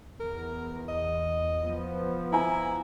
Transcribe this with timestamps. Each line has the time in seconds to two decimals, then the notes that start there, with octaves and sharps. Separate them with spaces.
0.20 E2 A#4
0.88 D#5
1.63 F3 B3
2.33 E4 G#5 A#5